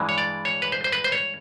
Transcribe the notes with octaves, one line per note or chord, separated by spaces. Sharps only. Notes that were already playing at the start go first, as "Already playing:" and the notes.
Already playing: G2 E3 G#3
C#5
D5
C#5
B4
C5
C5
B4
C5
C#5